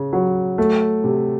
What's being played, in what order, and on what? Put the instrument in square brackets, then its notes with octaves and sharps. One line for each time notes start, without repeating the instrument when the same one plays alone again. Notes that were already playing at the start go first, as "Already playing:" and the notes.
Already playing: [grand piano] C#3
F#3
A3
C3